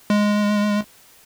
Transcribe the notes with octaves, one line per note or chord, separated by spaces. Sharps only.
G#3